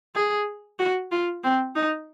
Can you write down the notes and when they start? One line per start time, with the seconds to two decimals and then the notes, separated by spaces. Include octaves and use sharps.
0.15 G#4
0.79 F#4
1.11 F4
1.43 C4
1.75 D#4